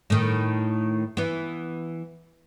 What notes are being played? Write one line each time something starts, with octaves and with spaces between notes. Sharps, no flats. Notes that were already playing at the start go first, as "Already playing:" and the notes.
A2 D#3
E3 B3